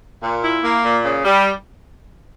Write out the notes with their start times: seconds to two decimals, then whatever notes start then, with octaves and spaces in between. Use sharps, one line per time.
0.22 A#2
0.43 E4
0.63 A#3
0.83 A#2
1.04 C#3
1.25 G3